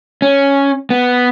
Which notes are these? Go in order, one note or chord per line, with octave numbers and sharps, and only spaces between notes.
C#4
B3